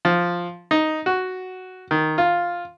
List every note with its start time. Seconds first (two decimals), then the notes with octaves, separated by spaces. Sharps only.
0.05 F3
0.71 D#4
1.06 F#4
1.91 D#3
2.18 F4